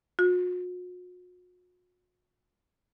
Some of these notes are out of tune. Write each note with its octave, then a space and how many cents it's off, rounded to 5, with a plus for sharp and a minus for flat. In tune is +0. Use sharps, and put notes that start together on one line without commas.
F#4 -45